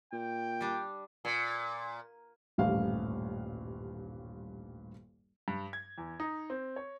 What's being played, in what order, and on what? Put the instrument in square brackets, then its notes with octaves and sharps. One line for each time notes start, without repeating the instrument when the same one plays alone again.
[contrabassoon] A#2 [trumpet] G5
[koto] G3 D4
[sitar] A#2
[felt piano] D#1 A1 G2 F5
[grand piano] G2
G#6
E2
D#4
C4
C#5